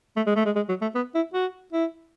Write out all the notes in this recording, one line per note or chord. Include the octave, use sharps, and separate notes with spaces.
A3
G#3
A3
G#3
G#3
F#3
A3
B3
E4
F#4
E4